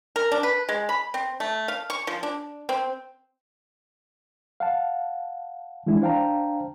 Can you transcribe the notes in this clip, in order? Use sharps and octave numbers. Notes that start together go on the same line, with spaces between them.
A#4
D4
B4
G#3
B5
C4
A3
F5
C#6
F3
D4
C4
F5 F#5 A5
E3 G#3 D4 E4
D4 C5 F5 G5 A5 A#5